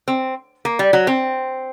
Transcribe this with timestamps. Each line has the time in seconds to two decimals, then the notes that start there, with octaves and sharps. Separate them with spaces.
0.08 C4
0.65 A#3
0.79 G3
0.93 F#3
1.07 C4